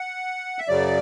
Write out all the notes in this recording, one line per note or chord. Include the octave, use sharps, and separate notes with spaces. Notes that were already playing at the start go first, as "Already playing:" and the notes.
Already playing: F#5
E5
F#2 C#3 F#3 D5